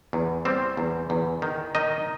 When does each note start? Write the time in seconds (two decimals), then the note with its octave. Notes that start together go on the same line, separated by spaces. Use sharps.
0.13 E2
0.45 G3 C4 C5
0.77 E2
1.10 E2
1.42 D#3
1.75 D#3 D#4 D#5